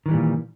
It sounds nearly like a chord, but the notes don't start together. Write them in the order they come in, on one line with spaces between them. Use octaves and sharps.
D#3 E3 G3 A#2